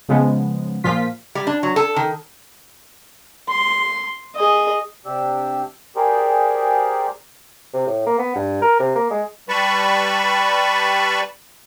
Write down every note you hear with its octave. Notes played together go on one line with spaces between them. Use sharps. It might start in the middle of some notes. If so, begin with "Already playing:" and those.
C#3 F3 G#3 B3
A#2 F3 F4 B6
G3
D4
F#3
A4
D#3
C6
G#4 D#5
C3 D4 G4 E6
G4 G#4 A#4 C5 D5
C3
A2
A#3
B3
G2
A#4
C3
A#3
G#3
G3 B4 A5 B5 C#6